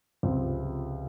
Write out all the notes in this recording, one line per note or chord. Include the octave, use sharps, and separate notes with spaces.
C#2 C3 F3 C4